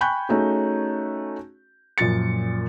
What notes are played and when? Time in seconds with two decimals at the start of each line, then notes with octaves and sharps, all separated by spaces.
0.01 G5 G#5 B5 C#6 F#6 G6
0.29 A3 C#4 D#4 F#4 G#4
1.98 F#2 A#2 F3 A6 C#7